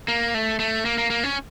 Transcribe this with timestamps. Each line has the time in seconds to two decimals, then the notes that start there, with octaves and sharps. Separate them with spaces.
0.08 A#3
0.34 A3
0.59 A3
0.85 A#3
0.98 A#3
1.10 A#3
1.24 C#4